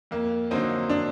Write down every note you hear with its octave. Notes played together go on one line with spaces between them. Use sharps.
F2 A#3
D3 F#3 A#3 C4 D#4
D4